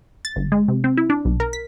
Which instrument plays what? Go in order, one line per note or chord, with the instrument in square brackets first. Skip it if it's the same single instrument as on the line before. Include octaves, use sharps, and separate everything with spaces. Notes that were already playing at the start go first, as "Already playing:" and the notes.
[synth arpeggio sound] A6
G1
G#3
C3
C4
E4
D4
B1
A#4
B6